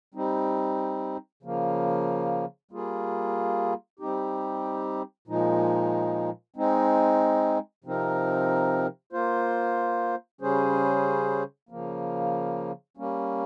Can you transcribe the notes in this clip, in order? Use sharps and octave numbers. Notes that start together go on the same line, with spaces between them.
G3 C4 D#4
C#3 F3 A#3
G3 A#3 F4 G#4
G3 C4 D#4 G4
A#2 F3 G#3 D#4
G#3 C4 D#4
C3 F3 C4 D#4 A#4
A#3 F4 C5
C#3 G3 C#4 G#4 C5
C#3 F3 A#3
G3 A#3 C#4